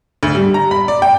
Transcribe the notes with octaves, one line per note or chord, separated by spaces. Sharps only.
D2
G3
A#5
B5
D5
G5